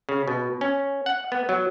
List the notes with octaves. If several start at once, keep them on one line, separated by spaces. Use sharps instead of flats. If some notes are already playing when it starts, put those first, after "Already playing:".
C#3
B2
C#4
F#5
B3
F#3